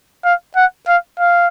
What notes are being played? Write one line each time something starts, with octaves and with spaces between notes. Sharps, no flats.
F5
F#5
F5
F5